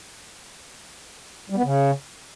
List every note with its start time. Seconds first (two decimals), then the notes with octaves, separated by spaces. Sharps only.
1.50 G3
1.57 B3
1.63 C#3